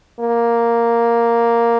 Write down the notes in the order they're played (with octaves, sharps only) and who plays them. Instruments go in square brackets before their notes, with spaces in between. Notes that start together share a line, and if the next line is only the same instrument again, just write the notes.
[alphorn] A#3